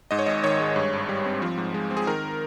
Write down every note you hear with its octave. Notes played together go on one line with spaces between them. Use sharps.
G#2 D#5
C#5
G#1 D#5
D#3 C#5
G#3
G2
G#1
G3
C4
F3
G#2
G#3
C4
G#4
D#3 A#4